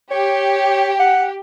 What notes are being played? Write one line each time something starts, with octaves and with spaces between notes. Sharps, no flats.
G4 C#5
F#5